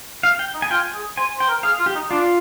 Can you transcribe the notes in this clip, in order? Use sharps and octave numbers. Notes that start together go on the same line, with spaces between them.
F5
G5
D#4
G#5
F4 G5
G#5
G#4
C5 G#5
C5 G5
A#4
G#4 F5
F4
G4
D#4
D4 F4